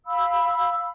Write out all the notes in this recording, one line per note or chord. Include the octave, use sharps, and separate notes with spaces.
F5 B5 E6